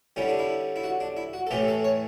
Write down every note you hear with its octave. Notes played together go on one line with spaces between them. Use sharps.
D3 G3 C#4 E4
D4
E4
E4
F#4
D4
E4
F#4
A4
A2 E3 A3 C#4 G4
A4
C#5